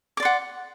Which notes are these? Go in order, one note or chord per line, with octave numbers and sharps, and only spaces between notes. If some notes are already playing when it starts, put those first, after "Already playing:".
D5 F#5 C6 D6